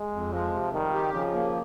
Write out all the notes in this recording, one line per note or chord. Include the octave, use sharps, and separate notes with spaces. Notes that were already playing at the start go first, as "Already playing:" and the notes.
Already playing: G#3
F2
F3 G#3
C3
D#3 G3
G4
C#3 F3
A#3